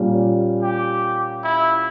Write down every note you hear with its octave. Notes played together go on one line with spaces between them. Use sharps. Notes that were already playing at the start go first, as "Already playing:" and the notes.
Already playing: A#2 G3 C#4
G4
E4